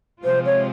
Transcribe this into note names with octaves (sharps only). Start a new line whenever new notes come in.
C3 F3 G#3 C4 F4 C5
C#5